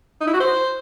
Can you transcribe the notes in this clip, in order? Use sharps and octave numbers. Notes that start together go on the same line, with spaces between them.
D#4
E4
F#4
C5